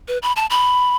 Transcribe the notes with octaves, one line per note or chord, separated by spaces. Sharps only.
B4
B5
A5
B5